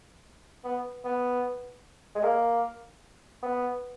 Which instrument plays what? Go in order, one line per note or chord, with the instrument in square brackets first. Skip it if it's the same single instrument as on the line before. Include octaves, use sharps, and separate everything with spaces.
[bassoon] B3
B3
G#3
A#3
B3